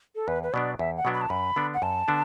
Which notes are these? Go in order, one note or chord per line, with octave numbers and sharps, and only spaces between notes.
A4
E2 B4
B4
B2 F#3 B3 D4 D5
E2 E5
F#5
B2 F#3 B3 D4
B5
A5
F#2 B5
D3 B3 D4
F#5
F#2 A5
D3 B3 D4